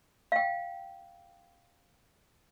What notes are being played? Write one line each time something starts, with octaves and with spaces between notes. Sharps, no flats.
F5 G5